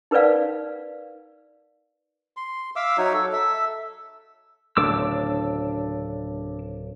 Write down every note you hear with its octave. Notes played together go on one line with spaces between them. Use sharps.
D#4 A#4 B4 D5 F5
C6
E5 F5 D6 E6
F#3 D#4 F#4 C#5
A4
A4 E5
D1 C#3 D4 D6 E6